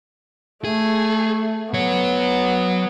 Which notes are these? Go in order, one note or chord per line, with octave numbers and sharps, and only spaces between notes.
A3 G#4
F#3 B3 C#5